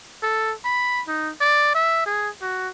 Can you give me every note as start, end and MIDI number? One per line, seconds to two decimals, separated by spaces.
0.23 0.53 69
0.65 1.01 83
1.08 1.31 63
1.41 1.70 74
1.75 2.06 76
2.06 2.29 68
2.42 2.69 66